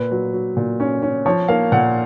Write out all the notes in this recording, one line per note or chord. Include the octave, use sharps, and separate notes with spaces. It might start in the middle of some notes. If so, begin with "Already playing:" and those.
Already playing: A#2 B4
F#3
F#3
A#2
C#4
C#4
F3 C#5
A#3 F5
A#2 F#5